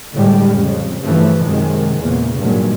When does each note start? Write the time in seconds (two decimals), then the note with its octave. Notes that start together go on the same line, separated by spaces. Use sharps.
0.14 A2 D3 G3 G#3
0.53 F2 C#3
1.03 G2 C#3 E3 F3 A3
1.44 F#2 C3 D#3 G#3
1.98 E2 A#2 C#3
2.38 G#1 G2 A#2 F#3 G#3